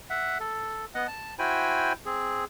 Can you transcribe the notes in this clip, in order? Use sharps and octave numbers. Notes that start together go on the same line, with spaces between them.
E5 F#5
A4
B3 D#5 F#5
A5
E4 F#4 C5 G5 G#5 B5
C4 G#4